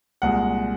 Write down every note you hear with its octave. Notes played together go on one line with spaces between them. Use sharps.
C2 A#2 G#3 F#5